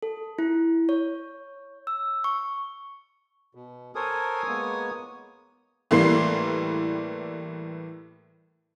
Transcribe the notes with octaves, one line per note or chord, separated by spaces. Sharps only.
A4
E4
C#5
E6
C#6
B2
A4 A#4 C5 C#5 G#5 D#6
G#3 A#3 B3
A2 E3 G3 A#3 C6 C7